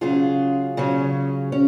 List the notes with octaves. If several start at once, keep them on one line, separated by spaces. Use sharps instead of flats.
C#3 F#3 C#4 F4 G#4
C#3 F#3 C#4
C#4